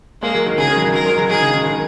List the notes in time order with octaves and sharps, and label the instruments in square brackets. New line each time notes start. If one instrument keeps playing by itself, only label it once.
[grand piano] G#3 [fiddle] A#3
[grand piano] F#3
D#3
[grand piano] C#3 [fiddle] G#4
[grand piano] D#3
F#3
D#3
[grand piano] F#3 [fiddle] A#4
[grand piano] G#3
F#3
[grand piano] D#3 [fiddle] G#4
[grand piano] C#3
D#3
D#3